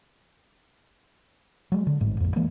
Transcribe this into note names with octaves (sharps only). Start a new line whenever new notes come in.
F#3 G#3
D3
A1 G#2
A#1 F2
E3 G#3 A#3